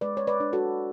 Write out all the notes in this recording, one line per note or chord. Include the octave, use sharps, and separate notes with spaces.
G#3 B4 D5
C#5
B4 D5
D4
F#4 A4